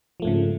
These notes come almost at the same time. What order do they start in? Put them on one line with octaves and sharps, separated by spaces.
F3 A3 G#2 C#3